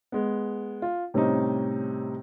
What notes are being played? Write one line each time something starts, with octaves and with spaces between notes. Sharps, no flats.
G#3 B3
F4
A2 C3 G3 C4 C#4 D#4